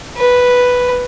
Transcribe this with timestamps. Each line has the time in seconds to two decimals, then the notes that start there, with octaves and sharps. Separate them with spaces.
0.17 B4